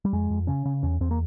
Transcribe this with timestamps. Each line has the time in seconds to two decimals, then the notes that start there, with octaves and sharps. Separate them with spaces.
0.05 G3
0.13 F2 G#3
0.30 F2
0.47 C#3 C#4
0.65 C#3
0.83 E2 C#4
1.00 E2 C4
1.11 A#3